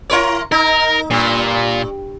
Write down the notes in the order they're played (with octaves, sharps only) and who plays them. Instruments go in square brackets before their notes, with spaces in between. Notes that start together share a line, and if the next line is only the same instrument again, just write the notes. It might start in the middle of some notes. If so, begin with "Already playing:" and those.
[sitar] E4 A#4 C#5
[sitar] D#4 [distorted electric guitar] A#4
[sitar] G2 [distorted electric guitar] A#2